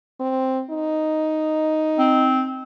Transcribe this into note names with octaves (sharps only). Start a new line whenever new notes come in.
C4
D#4
C4